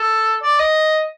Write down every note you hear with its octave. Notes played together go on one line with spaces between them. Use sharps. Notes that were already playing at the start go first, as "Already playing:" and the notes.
Already playing: A4
D5
D#5